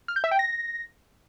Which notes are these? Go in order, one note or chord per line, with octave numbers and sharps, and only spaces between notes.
F6
G6
E5
G5
A#6